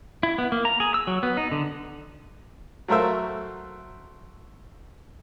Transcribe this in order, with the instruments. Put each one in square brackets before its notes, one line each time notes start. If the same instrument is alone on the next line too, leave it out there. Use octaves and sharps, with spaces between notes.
[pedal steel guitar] E4
B3
A#3
A#5
G#4
E6
F#3
B3
D#4
D3
[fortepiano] F#3 A3 A#4 C5 E5